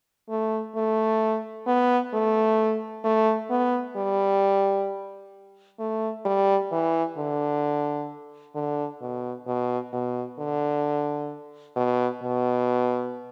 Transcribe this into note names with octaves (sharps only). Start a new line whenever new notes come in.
A3
A3
B3
A3
A3
B3
G3
A3
G3
E3
D3
D3
B2
B2
B2
D3
B2
B2